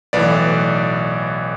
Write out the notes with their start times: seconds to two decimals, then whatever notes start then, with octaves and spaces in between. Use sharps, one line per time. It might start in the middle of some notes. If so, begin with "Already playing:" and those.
0.13 B1 A2 E3 B4 D5